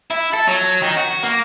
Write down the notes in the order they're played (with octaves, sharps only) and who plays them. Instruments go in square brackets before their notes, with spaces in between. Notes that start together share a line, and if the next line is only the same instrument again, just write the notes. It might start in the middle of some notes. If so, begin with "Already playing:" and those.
[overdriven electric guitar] E4
A4
F#3
D#3
F#4
A#3